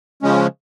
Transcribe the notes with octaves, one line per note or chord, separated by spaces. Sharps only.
C#3 F3 G#3 C#4